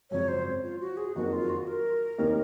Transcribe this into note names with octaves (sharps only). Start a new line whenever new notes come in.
G#1 F#2 C#3 F3 C4 C#5
C5
F4
F#4
G#4
F#1 F2 D#3 F#3 A#3 F#4
F4
F#4
A#4
F1 D#2 D#3 A#3 D#4